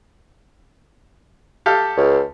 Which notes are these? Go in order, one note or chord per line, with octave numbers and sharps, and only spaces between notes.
G4 A4 F5
C#2